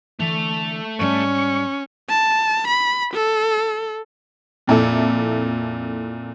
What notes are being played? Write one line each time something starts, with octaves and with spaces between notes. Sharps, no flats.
D3 E3 A3 A4 F7
G#2 G3 C#4 C#6
A5
B5
A4
F2 A#2 E4 A4